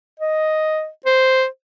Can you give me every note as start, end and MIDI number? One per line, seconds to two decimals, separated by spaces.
0.20 0.88 75
1.06 1.45 72